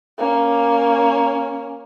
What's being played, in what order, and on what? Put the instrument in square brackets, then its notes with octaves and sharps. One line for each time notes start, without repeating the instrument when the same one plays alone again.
[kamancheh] A#3 C#4